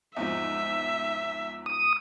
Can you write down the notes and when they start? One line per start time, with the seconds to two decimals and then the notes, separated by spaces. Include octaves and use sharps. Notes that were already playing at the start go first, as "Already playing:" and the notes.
0.16 E2 G#2 F3 E5
1.66 D#6